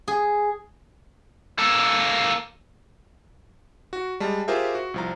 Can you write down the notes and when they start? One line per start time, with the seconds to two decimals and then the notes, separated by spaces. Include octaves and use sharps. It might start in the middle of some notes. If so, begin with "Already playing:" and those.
0.08 G#4
1.59 A#3 A4
3.93 F#4
4.20 G3 G#3 A5
4.48 F4 G4 G#4 A#4 C5 E5
4.75 F#4
4.94 C2 F3 A#5